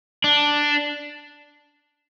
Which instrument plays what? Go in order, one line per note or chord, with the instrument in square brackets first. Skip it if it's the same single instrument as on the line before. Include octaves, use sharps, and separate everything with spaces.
[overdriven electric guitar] D4